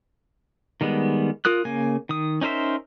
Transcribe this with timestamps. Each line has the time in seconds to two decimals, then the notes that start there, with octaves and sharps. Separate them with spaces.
0.81 D#3 G3 G#3 B3
1.45 F4 A#4 D#6 F#6
1.65 C#3 A#3 G#5
2.09 D#3 D#6
2.41 C#4 D#4 A#4 C5 E5